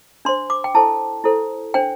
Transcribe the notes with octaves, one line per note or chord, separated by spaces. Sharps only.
D4 C5 C6
D6
G5
E4 A4 C5 A5
E4 A4 C5
D4 C5 G5